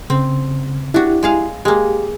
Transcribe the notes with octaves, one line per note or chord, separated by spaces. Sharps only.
C#3 C4
D4 E4 F#4 G4
G#3 G#4 F5
G#3 A#3 G4